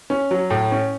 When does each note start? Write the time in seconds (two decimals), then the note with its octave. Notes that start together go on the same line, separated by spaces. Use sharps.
0.10 C#4
0.31 F#3
0.50 A2
0.72 C#4